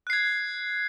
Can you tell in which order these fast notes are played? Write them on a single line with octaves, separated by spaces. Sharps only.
F#6 C7 G#6